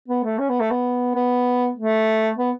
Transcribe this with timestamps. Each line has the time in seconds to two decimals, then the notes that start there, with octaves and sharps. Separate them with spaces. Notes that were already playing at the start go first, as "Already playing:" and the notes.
0.08 B3
0.24 A3
0.39 C#4
0.49 B3
0.60 A3
0.71 B3
1.15 B3
1.76 A3
2.37 B3